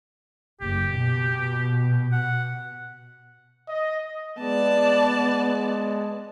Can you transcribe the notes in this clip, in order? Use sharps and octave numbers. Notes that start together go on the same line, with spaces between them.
F#1 G4
B2
F#5
D#5
G#3 B3 D5 A5